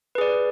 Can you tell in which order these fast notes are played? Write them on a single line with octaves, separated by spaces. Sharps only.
B4 G#4 D5